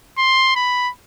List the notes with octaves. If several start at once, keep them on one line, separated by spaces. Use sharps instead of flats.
C6
B5